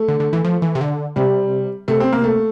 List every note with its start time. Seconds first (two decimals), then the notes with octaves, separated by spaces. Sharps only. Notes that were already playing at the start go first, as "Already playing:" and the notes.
Already playing: A3
0.08 D3
0.20 D3
0.33 E3
0.45 F3
0.62 E3
0.75 C3
0.81 D3
1.16 C3 G3
1.88 C3 A3
2.00 C4
2.12 A#3
2.24 A3